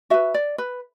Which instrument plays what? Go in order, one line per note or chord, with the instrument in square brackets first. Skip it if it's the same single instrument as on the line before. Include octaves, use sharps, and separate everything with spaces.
[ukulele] F#4 B4 E5
D5
B4